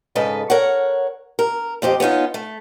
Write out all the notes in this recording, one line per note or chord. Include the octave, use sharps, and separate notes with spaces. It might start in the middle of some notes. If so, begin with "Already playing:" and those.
G#2 C#3 A4 B4 D#5
A#4 C#5 F#5
A#4
F2 C4 G4 D#5
B3 C#4 D#4 F4
A3